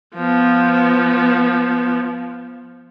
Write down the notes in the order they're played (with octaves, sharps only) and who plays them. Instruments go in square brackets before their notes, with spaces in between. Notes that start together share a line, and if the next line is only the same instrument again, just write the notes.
[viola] F3 B3